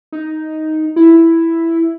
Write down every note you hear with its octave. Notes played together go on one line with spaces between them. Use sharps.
D#4
E4